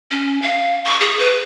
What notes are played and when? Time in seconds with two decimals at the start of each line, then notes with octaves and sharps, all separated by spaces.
0.11 C#4
0.42 F5
0.85 C#6
1.01 G#4
1.19 B4